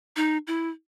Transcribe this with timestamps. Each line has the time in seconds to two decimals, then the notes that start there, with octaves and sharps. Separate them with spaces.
0.16 D#4
0.47 E4